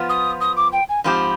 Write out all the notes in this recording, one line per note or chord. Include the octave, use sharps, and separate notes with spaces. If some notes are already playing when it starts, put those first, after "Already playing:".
Already playing: F3 B3 F4
D#6
D#6
D6
G5
G#5
G#2 F3 C4 G4 B5